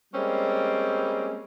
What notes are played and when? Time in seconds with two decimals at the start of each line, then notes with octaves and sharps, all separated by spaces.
0.14 G3 G#3 A#3 C4 C#4